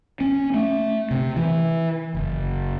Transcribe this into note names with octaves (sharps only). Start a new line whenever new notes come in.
C#4
A3
C3
E3
F#1